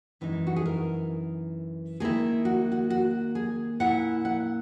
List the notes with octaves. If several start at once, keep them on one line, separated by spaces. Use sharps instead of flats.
F#2 E3 G#3 D#4
F#4
G#4
A#4
D#3 A#3 E4 G#4
F#4
F#4
F#4
G#4
A#2 A#3 E4 F#5
F#5